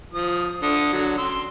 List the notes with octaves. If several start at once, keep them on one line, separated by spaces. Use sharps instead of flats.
F3 D#6
D3 D#6
D3 F#3
C6 E6